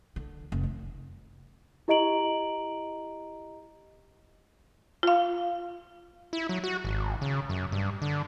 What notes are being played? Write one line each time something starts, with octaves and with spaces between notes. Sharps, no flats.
D3
F1
D#3
E4 G4 D#5 A#5 D7 F#7
F4 F5
E4
F#3
F#4
G#1
C#3
F#2
G2
D3